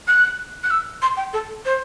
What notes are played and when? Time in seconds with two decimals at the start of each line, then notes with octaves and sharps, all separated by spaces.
0.08 F#6
0.63 F#6
0.70 E6
1.02 C6
1.17 G5
1.33 A4
1.65 C5